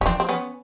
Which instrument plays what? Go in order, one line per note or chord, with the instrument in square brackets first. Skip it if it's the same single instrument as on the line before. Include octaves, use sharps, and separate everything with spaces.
[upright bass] E3 [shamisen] C#4
[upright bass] F3 [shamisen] C4 D4
[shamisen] C4
B3 C#4